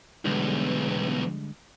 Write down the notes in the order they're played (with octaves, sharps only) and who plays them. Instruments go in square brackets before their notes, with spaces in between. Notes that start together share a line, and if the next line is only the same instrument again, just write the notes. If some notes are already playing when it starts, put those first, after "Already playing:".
[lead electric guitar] B1 E2 [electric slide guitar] D3 G3 G#3